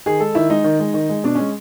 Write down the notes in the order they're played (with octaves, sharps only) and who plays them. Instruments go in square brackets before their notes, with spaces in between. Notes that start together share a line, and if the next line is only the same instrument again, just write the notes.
[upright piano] D#3 G#4
G#3 A4
D#3 E4
G#3 D#4
D#3
G#3
D#3
G#3
B2 D4
G#3 C#4